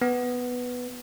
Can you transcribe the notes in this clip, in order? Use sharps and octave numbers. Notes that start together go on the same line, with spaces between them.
B3